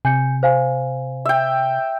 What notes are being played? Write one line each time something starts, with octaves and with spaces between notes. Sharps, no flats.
C3 G#5 G6 C#7
C5 F5 G#5
E5 G5